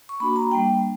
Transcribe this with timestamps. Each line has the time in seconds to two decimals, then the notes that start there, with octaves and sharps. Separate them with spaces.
0.09 C#6
0.20 A#3 D4 F#4 B5
0.36 A#5
0.51 G3 A#3 D4 G5